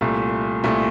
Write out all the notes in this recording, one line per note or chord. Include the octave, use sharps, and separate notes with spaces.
C2 A#2 A3
C2 A#2 A3